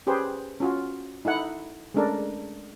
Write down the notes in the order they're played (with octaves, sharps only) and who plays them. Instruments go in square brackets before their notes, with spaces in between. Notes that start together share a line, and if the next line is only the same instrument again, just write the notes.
[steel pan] C#4 G4 G#4 B4 C5
C#4 F4 F#4
D#4 E4 A4 F#5
G#3 A3 C#4 D4 A4 A#4